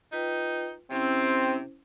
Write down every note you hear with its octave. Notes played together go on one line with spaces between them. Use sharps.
D#4 F4 B4 G5
C3 C4 C#4 E4 C5